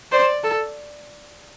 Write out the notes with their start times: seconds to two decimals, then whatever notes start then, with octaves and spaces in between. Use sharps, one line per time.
0.12 C5 D5
0.44 A4